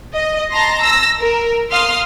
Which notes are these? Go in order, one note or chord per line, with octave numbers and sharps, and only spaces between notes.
D#5
A5 A#5 C6 A#6
E6 A#6
A#4
F5 C6 D#6 F6